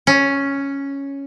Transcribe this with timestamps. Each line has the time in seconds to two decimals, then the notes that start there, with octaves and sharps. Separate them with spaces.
0.07 C#4